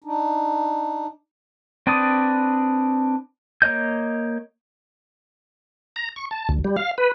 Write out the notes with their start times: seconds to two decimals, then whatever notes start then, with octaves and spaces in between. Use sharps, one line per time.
0.04 D4 D#4
1.87 C4 D4 B4 D5 D#6
3.62 A#3 C#5 D#5 G6
5.96 A#5
6.16 C#6
6.31 A5
6.49 D2
6.64 G3
6.76 F5
6.98 B4